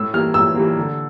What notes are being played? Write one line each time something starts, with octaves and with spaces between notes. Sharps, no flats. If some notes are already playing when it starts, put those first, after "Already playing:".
Already playing: A2 E6
E3 G3 A#3 F6
A2 E6
E3 G3 A#3
D3